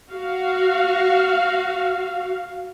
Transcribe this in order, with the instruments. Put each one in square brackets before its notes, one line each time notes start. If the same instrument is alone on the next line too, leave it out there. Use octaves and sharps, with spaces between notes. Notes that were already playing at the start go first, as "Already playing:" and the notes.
[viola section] F#4 F5